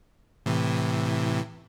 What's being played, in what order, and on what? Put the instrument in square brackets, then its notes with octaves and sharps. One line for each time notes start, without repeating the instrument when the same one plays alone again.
[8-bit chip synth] A2 C3 E3